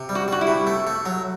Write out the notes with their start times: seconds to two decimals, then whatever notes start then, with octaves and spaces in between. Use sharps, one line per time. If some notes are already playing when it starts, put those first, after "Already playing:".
Already playing: C3
0.09 G3
0.15 F#4
0.28 G3 F#4
0.41 E4
0.47 C3
0.67 A3
0.87 A3
1.06 F#3